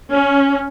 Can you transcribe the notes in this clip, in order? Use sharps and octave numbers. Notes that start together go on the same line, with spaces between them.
C#4